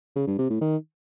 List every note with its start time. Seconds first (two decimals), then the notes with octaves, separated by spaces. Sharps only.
0.16 C#3
0.27 G2
0.39 C3
0.50 A2
0.61 D#3